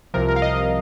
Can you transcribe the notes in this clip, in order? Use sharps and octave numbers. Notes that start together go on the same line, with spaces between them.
C2 C3 F3 A#4
A#4
F5
D#5
D#5